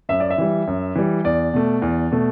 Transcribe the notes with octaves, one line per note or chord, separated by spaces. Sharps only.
F#2 E5
D5
E5
E3 G3
F#2
E3 G3
E2 D5
B2 A3
E2
B2 A3